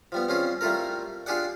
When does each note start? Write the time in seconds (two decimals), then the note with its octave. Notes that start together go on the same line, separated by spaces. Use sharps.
0.12 F3 G3 B3
0.28 G3 C4 C#4 F4 G#4
0.61 G3 A3 E4 F4 A4 A#4
1.26 D4 F4 G4 G#4 D5 F#5